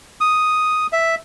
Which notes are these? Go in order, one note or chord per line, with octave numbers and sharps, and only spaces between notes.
D#6
E5